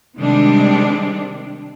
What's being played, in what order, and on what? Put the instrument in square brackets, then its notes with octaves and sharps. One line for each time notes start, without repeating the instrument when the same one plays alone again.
[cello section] C3 D#3 G3 G#3 C4 D4